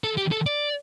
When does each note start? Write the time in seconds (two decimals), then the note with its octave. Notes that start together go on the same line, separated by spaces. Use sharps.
0.04 A4
0.17 G4
0.32 A4
0.46 D5